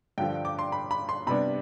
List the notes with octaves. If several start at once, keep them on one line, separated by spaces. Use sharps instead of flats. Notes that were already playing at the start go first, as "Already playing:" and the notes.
G2 D3 F3 G5
D6
C6
B5
B5
C6
C3 G3 B3 D4 B5